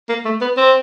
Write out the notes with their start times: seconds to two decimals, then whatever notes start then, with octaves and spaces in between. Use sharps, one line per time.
0.09 A#3
0.25 A3
0.41 B3
0.57 C4